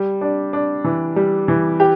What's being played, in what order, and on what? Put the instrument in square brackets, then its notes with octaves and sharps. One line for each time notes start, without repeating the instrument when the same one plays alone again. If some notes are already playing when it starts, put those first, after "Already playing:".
Already playing: [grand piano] G3
D4
D4
E3
G3
E3
G4